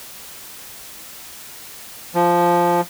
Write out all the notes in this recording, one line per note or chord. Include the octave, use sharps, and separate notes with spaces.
F3